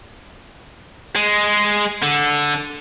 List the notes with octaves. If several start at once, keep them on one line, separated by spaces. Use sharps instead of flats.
G#3
D3